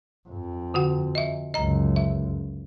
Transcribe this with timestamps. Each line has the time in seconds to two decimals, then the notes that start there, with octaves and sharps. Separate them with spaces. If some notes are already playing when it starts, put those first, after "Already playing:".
0.29 F2
0.74 D3 F#4 F#5
1.15 D#5 E5
1.54 C#2 F#2 D#5 A#5
1.96 E5